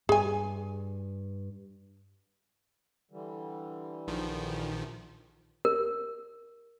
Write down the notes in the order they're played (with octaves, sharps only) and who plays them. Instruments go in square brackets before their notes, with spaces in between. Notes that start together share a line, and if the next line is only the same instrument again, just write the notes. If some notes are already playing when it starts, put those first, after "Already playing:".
[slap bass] G2 [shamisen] G#4 G#5
[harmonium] D3 E3 G3
[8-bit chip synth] A#1 D#3 F3
[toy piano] A#4